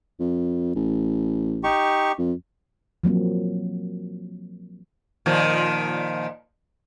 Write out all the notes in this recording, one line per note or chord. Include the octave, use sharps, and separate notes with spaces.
F2
A1
D#4 G4 C#6
F2
F3 F#3 A#3 C4
A#2 D#3 F3